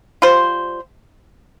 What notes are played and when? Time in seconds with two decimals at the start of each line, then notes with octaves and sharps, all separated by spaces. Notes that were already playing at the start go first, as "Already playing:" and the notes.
0.22 G3 F4 C5